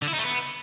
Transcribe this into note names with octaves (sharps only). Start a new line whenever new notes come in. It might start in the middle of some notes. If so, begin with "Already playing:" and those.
D3
E4
D#4
A3
B3